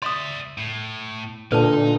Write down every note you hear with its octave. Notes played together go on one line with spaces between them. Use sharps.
D5 E5 C6 D#6
A2
A#2 D3 D#4 B4 A5